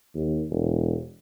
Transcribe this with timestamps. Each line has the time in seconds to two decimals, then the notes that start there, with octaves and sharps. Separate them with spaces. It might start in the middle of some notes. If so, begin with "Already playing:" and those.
0.15 D#2
0.51 E1